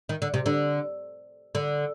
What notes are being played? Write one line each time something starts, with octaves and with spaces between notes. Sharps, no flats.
D#3
D3
C3
D3
D3